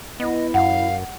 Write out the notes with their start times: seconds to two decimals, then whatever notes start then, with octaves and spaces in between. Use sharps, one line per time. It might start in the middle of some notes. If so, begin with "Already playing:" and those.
0.20 B3 E4 D#5
0.54 F#2 F5 F#5